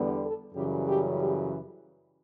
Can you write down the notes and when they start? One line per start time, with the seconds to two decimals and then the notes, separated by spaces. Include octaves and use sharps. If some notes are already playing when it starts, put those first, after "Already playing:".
Already playing: E2 D3 G3 B3
0.23 A4
0.55 F#2 C#3 E3 G3 G4
0.87 G4
1.19 G4